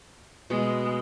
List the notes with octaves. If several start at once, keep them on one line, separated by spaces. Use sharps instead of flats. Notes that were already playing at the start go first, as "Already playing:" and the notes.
B2 G#3